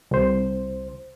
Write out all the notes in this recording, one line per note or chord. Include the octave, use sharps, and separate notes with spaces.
C2 C5